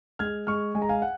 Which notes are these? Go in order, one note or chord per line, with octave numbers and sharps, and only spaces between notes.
G#3 F6 G#6
G#3 C#6 F6
G#3 G#5
A#5
F5 G#5
F#5